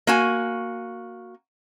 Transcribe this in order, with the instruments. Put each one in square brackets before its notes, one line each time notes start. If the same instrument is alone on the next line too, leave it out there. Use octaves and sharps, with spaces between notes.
[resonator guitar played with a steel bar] A#3 F#4 G#5